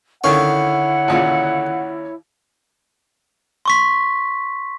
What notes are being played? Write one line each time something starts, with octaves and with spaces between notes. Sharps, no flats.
D3 D#3 C#4 E4 C#5 F5 F#5 C#6
D#2 A#2 C#3
C6 C#6 B6